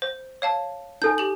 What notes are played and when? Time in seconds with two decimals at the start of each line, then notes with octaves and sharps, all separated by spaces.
0.02 C5
0.42 C#5 F5 A5
1.02 D#4 A4 G#5 G6
1.18 G4 F#7